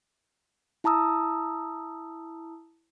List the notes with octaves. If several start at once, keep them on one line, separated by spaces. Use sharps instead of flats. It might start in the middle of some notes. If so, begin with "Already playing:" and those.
E4 A5 A#5 D#6 E6